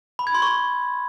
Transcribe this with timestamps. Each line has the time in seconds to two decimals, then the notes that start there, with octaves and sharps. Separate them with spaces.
0.19 B5
0.27 G#6
0.35 C6
0.42 C#6